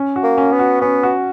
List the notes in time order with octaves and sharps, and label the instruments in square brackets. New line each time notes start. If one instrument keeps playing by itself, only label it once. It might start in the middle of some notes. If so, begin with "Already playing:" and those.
Already playing: [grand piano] C#4
F#4
[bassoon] A#3
[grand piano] C#4
[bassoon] B3
[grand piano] F#4
[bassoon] B3 [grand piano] C#4
[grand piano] F#4